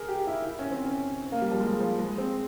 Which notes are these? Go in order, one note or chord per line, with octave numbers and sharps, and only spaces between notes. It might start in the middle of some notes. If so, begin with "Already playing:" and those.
Already playing: G#4 A#4
G4
E4
E4
C#4
C4
C#4
A#3
G3
F3
G#3
F3
G#3
C4